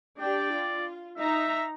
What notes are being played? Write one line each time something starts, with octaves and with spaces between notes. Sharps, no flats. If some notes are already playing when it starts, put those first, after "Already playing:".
D4 G4 D5 G5
F4
D#4 E5 A#5